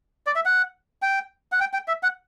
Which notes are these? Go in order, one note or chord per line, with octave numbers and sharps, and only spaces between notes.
D5
E5
F#5
G5
F#5
G5
G5
E5
F#5